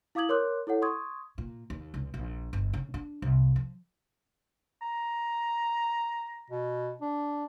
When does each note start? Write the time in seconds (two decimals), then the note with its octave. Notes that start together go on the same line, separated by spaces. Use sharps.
0.15 E4 F5 D6 D#6 G#6 F#7
0.29 A#4 C#5 C6 D6 F#6
0.67 E4 A4 C#5 F#5
0.82 C6 C#6 D#6 G#6
1.38 A#2
1.70 D#2
1.94 C#2
2.14 A#1
2.53 G1
2.74 C#3
2.94 D4
3.22 C2
3.56 F3
4.82 A#5
6.50 B2
7.01 D4